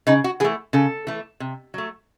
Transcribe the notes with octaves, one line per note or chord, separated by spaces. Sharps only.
C#3 D#4
F#4
E3 A3 G#4
C#3 A4
E3 A3
C3
F#3 A3